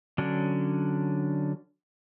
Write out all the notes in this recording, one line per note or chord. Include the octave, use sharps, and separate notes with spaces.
D3 F#3 C#4 D4